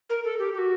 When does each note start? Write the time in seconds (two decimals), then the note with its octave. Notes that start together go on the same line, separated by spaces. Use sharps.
0.10 A#4
0.24 A4
0.39 G4
0.54 G4
0.58 F#4